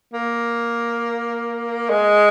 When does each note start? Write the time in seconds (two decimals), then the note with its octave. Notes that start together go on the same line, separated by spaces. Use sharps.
0.14 A#3
1.90 G#3